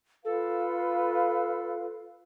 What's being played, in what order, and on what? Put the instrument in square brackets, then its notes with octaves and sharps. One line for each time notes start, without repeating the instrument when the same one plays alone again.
[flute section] F4 B4 F5 [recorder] A4